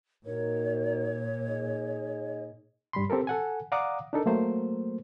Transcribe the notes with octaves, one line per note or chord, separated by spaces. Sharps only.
A#2 D#4 F#4 A#4 C#5
D#4 G#4 D#5
G2 G3 B5 C6
C4 G4 A4 A#4
A4 F#5 G#5
D5 F5 F#5 A#5 D6 D#6
D4 D#4 A4 A#4
F#3 A3 A#3 C5